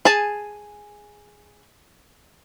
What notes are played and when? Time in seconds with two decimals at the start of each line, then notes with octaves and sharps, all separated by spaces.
0.05 G#4 G#5 A5